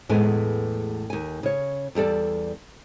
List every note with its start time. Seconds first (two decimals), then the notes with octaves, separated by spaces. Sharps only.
0.09 E2 A2 G#3 A3 B3 G#5
1.10 D#2 G#5
1.43 C#3 C#5
1.95 E2 G3 A4 D5